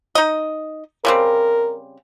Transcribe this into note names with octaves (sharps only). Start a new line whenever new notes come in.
D#4 D#5
C#3 G3 C4 A#4